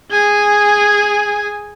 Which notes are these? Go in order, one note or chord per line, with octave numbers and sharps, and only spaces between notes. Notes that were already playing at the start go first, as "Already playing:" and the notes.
G#4 G#5